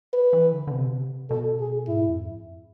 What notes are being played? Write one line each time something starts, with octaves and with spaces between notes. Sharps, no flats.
B4
E3
D3
D3
C3
B2
C3
B2 A4
G#4
G#2 E4
F2